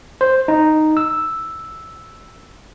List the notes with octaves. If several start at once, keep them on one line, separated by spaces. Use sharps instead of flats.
C5
D#4
E6